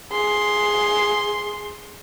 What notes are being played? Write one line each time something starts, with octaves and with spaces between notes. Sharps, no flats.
G#4 C6